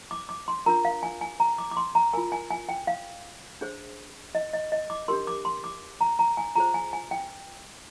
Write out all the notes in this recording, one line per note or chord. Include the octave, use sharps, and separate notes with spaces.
D6
D6
C6
D4 F4 A#4 A#5
F5
G#5
G#5
A#5
D6
D6
C6
A#5
F4 A#4 G#5
G#5
G#5
G5
F5
D4 G#4 C5
D#5
D#5
D#5
D6
D4 G4 A#4 C6
D6
C6
D6
A#5
A#5
G#5
F4 G#4 C5 A#5
G#5
G#5
G5